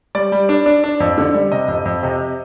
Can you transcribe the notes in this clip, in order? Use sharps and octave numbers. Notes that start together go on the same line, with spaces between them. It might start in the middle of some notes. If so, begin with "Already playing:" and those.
G3 D5
G3
D4
D4
D4
F2
D3
G3
C3 D#5
F2
F2
C3